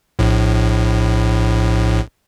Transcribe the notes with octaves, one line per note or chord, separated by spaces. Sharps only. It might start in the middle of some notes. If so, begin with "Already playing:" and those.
A#1 A2